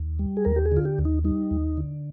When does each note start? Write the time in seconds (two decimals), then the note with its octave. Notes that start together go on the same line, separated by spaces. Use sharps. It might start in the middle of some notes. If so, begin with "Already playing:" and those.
Already playing: D#2
0.19 G3
0.37 G#4
0.45 D#2 A#4
0.56 G4
0.66 G#4
0.72 D3 F4
0.85 G4
0.98 D#2
1.05 D#4
1.24 G3 D#4
1.51 D#2
1.77 D3